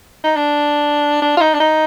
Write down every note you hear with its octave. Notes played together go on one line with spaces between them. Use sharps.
D#4
D4
D4
F4
D#4
D4
D#4